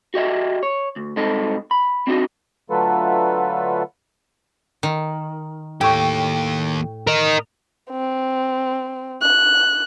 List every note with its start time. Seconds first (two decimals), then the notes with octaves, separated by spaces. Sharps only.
0.14 F#4 G4 D#5 E5
0.63 C#5
0.96 D2
1.17 C2 G#2 C4 D#4 A4 D#5
1.71 B5
2.07 C4 D4 D#4 F#4 D#5
2.70 D3 F#3 A3 F4 A4 B4
4.83 D#3
5.81 D#2 A2 G4 G5 C#6
7.07 A#4 D#5
7.90 C4
9.22 F#6